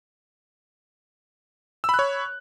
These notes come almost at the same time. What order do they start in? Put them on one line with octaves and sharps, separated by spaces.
E6 B5 F#6 C#5